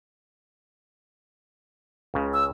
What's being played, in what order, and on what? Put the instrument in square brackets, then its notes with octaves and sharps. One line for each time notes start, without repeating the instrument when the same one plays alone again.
[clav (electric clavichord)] C#2 C#3
[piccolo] E6